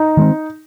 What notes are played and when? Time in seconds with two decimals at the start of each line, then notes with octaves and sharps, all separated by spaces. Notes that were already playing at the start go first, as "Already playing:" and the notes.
Already playing: D#4
0.17 D#3 G#3 C4